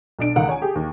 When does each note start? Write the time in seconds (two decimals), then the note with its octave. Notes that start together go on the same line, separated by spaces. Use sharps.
0.19 B1 D4 D7
0.36 C#2 D#3 F5 F#5
0.49 C#5 G#5
0.62 G4 G#4
0.75 D#2